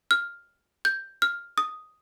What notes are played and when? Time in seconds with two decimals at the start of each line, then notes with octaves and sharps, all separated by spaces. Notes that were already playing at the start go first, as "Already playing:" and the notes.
0.11 F6
0.85 G6
1.22 F6
1.58 D#6